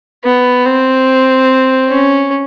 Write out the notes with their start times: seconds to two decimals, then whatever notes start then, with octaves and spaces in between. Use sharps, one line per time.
0.25 B3
0.66 C4
1.89 C#4